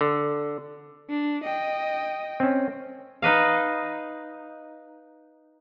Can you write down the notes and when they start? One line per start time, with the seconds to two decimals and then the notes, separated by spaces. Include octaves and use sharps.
0.01 D3
1.10 D4
1.44 D#5 G5
2.40 C4 C#4
3.22 D#4 B4 D#5 F5